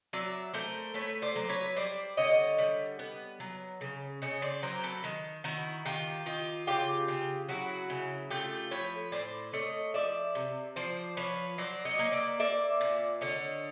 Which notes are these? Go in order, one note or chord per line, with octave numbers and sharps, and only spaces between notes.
F#3 D5 E5
A3 A#4 C5
A3 B4 C#5
C5 D5
F#3
B4 C#5
G3 C5 D5
D3 C#5 D#5
G3
B3
F#3
C#3
C#3 C#5 D#5
C5 D5
F#3 A#4 C5
A4 B4
D#3
D#3 E4 F#4
D#3 F4 G4
D#3 F4 G4
C#3 F4 G4
C#3
F#3 E4 F#4
C#3
A3 F4 G4
F3 B4 C#5
A2 C5 D5
A3 C#5 D#5
F3 D5 E5
C3
F3 C5 D5
F3 B4 C#5
F#3 C5 D5
C#5 D#5
A#3
D5 E5
A#3 D5 E5
A#2
D3 C#5 D#5